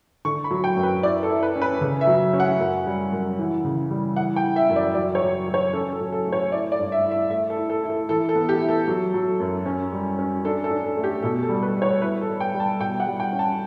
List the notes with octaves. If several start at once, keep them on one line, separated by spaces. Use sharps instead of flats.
D3 C#6
B5
F#3
G5
F#2
B4
E4 D5
A4
E4
B4
C#4
B4
C#3
E5
F#3
C#4
F#5
F#2
G3
F#2
E3
C#3
G3
E3 F#5
G5
E3
E5
F#2
D5
F#3 D5
C#5
F#3
F#3
C#5
C#4 A4
A4
F#3
A4
A3
C#5
E4 D5
D5
G2
E5
E4
E5
A3 E5
A4
E4
A4
E4
A4
E3 A4
A4
B3
G4
E4
A4
F#3
F#3
F#2
C#4
G3
C#4
D4 A4
A4
D4
A4
A3
G4
B2 A4
A4
G3
B4
G3
C#5
E4 B4
A4
G3
G5
G3
A5
B2 G5
F#5
G3
G5
C#4
A5